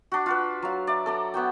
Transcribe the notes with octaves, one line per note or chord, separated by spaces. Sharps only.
D4 F#4
F4 F#4 B4
F#3 F5
D5 E5
A4 D5 A#5
B3 F#4 G5